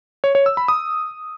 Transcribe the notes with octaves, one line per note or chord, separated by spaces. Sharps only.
C#5
C#5
E6
B5
D#6